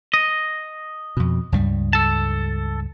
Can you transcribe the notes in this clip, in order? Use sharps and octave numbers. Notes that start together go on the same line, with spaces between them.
D#5
F2 B2
C#2 G2 G3
A4 A5